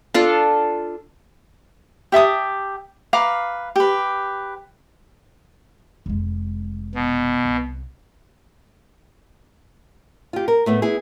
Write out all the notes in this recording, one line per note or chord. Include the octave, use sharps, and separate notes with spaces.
D4 F4 A4
G4 E5 A5 D#6
B4 F5 A#5 D6
G4 B4
F1 G#3
B2
C2
F4 G4
A#4
A2 A3 B3
B3 E4 G#4